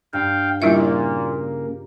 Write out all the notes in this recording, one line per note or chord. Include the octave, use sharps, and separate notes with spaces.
G2 F5 G5
A#2 C#3 G3 A#3 E4 F4 G4 E5